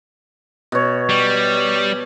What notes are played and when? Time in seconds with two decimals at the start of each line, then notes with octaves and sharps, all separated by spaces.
0.72 B2 C#5
1.09 G3